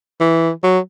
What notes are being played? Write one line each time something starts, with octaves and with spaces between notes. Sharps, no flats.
E3
F#3